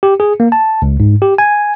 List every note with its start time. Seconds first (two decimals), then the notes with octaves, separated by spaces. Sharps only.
0.03 G4
0.20 G#4
0.40 A#3
0.52 A5
0.82 C#2
1.00 G#2
1.22 G4
1.38 G#5